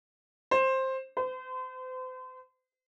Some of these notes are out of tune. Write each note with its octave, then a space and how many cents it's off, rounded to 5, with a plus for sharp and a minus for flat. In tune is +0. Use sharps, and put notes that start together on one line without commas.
C5 +10
C5 -40